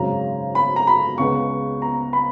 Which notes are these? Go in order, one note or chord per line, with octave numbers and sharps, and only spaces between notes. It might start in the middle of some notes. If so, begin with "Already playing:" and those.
Already playing: G#1 F#2 C#3 A#5
B5
A#5
B5
C#2 C#3 G#3 B3 C#6
A#5
B5